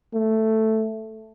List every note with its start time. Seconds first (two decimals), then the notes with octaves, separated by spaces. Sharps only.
0.14 A3